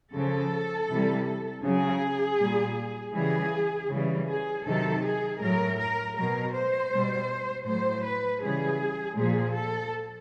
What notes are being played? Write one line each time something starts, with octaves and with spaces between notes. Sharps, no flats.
C#3 F3 A4
C3 E3 G3
C#3 F#3 G#4
A#2 G3
C#3 E3 G3 G#4
C#3 E3 G3
G#4
C3 D#3 F#3 A4
G#4
A2 F#3 A#4
A#4
B2 F#3 A#4
C5
B2 G3
A2 F#3 C5
B4
C#3 E3 G3 G#4
A#2 F3 G#4
A4